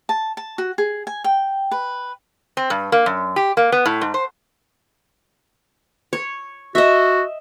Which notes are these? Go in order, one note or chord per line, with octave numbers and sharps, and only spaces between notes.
A5
A5
F#4
G#4
G#5
G5
B4
C4
G2
A#3
F#2
G4
A#3
B3
A2
G#2
C5
C#5
F#4 D#5 E5